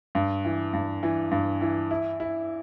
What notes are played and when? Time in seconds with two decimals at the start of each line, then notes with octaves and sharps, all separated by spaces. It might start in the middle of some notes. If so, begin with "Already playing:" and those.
0.15 G2
0.45 E3
0.73 G2
1.03 E3
1.31 G2
1.61 E3
1.91 E4
2.20 E4